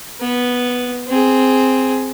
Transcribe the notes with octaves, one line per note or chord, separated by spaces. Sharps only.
B3
C4 G#4